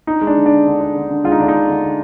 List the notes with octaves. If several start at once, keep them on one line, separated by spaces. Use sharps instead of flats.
D4 D#4
G#3
D4
D3
D4
D3
D3
D4
D3
D3
G#3 F4
D#4
D3 D4
D#4
D3
D3
D3